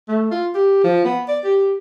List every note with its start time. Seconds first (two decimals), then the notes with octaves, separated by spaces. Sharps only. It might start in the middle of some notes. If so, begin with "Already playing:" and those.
0.08 A3
0.31 F4
0.55 G4
0.84 F3
1.05 B3
1.28 D5
1.44 G4